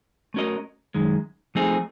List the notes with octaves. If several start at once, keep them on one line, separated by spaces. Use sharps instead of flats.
A3 C#4 F#4 A#4 D#5
F#2 D#3 G#3
F3 A3 C4 D#4 G#4